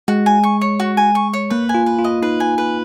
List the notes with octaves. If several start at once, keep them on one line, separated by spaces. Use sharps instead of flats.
G#3 F#4
G#5
C#6
C#5
F#4
G#5
C#6
C#5
A#3 B4
G#5
F4
B4
F4
D#5
D#4 B4
G#5
B4